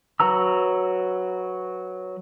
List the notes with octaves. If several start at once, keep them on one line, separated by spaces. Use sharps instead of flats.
F#3 F#4 B4 A#5 E6